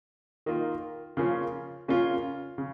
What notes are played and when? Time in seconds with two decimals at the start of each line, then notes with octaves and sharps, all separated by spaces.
0.46 D#3 A#3 F4
1.17 C#3 F3 A#3 C#4 F4
1.88 C#3 A#3 C#4 F4
2.58 C#3